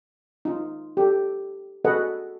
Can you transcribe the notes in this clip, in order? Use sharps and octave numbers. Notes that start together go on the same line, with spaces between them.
D#4 F4
G4 A4
F#4 G#4 A4 B4 D#5 F#5